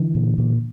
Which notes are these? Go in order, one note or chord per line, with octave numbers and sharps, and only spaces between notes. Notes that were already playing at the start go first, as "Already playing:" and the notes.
Already playing: D3 E3
A#2
A#2